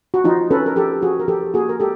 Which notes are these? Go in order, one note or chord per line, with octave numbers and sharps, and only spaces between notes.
F#4
F3 D#4 F4
C#4 A4 B4
A#4
F3 G4 A4
F3 F#4 G#4
A#4
F3 G4 A4
A#3 F#4 G#4
A#4
G#3 G4 A4